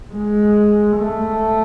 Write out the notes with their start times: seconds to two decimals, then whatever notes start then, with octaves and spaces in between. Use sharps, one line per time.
0.13 G#3
0.96 A3